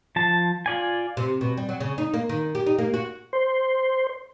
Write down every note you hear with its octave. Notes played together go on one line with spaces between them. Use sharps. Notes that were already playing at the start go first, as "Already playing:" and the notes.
F3 A5
F4 D5 G#5
C3
B2
G3
F#3
C#3
D#4
A#3
D#3
G4
D#4
A#3
F#4
C5